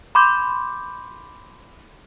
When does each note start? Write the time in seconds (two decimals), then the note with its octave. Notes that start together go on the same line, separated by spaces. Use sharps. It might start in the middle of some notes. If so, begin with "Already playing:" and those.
0.15 B5 C6 D6 G6